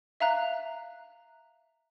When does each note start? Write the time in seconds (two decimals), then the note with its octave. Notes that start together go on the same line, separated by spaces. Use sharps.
0.20 E5 F5 A#5 F#6